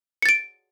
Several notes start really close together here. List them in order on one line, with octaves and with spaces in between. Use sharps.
C#7 A6 D7